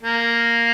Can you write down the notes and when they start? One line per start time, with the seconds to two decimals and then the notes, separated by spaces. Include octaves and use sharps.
0.03 A#3